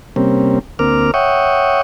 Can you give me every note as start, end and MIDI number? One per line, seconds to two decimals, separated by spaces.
0.16 0.59 48
0.16 0.59 55
0.16 0.59 58
0.16 0.59 60
0.16 0.59 61
0.79 1.11 38
0.79 1.11 58
0.79 1.11 60
0.79 1.11 70
0.79 1.11 86
0.79 1.11 89
1.14 1.82 73
1.14 1.82 76
1.14 1.82 78
1.14 1.82 79
1.14 1.82 85
1.14 1.82 87